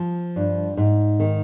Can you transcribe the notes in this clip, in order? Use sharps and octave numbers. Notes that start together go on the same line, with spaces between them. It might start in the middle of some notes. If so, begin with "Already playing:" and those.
Already playing: F3 F4
G2
G#2
D#3